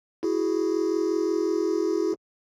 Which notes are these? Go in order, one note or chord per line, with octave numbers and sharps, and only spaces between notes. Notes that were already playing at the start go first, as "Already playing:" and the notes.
E4 F#4 G#4